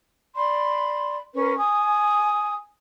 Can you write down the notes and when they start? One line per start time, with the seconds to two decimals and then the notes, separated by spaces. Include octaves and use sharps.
0.35 D5 B5 C6
1.34 C#4 A#4 B4
1.56 G#5 D#6